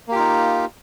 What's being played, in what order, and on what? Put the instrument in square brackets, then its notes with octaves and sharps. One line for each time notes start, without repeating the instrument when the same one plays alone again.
[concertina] A#3
G4
F4
D#4